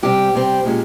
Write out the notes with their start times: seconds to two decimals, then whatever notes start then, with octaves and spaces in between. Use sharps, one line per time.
0.03 C3 G3 C4 G4
0.35 C3 G3 C4
0.65 A#2 G#3 C#4